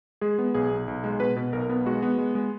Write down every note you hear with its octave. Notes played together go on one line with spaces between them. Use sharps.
G#3 G#4
B3
B1 G#4
B1
B1
G#3
B2 B4
B2
B1 A#4
B3
G#3 F#4
B3
G#3
G#3